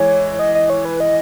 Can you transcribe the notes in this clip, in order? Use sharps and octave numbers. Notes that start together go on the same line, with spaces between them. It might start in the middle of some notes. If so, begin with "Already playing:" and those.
Already playing: E3 G#3 C#5
D#5
D#5
C#5
B4
D#5